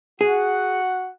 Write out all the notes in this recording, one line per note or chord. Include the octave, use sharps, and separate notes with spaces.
F#4 G#4 F#5